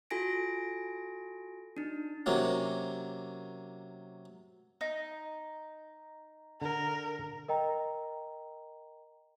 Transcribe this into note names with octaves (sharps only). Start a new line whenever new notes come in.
F4 F#4 A4 G#5 A#6 D7
D4 D#4
C3 F#3 A#3 C#4
D#4
D3 A#4
A#4 D#5 G5 A#5